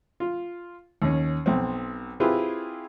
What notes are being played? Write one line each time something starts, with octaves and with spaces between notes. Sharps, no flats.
F4
D#2 C#4
B1 C4
C4 E4 F4 G4 G#4 B4